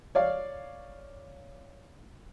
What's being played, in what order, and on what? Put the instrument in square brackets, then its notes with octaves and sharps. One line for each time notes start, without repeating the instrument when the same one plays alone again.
[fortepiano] C#5 D5 F5